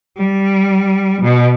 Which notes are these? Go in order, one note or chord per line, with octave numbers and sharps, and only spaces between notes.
G3
B2